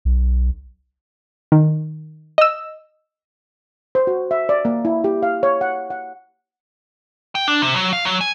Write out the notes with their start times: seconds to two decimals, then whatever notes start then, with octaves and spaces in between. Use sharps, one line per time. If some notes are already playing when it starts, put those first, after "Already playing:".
0.05 B1
1.52 D#3
2.38 D#5 E6
3.95 C5
4.07 F#4
4.31 E5
4.49 D5
4.65 A#3
4.85 E4
5.04 G4
5.23 F5
5.43 C#5
5.61 F#5
5.90 F#5
7.35 G5
7.48 D4
7.62 C3
7.76 F#3
7.93 F5
8.05 F#3
8.21 G#5